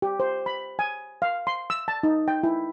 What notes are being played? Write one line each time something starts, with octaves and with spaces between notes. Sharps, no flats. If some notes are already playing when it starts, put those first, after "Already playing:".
G4
C5
B5
G#5
F5
C6
E6
A5
D#4
G5
E4